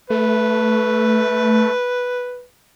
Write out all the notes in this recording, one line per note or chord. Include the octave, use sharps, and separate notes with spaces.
A3 B4